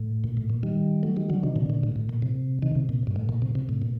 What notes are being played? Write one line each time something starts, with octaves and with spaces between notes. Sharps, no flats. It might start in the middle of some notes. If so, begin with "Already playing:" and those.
Already playing: A2
A#2
A2
A#2
D#3 G3
F#3 A3
D#3 G3
D3 F#3
C3 D#3
A#2 D3
A#2 D3
A2
A2
A#2
C3
C3 D#3
C3
A#2
G2
A2
A#2
C3
C3
A2
A#2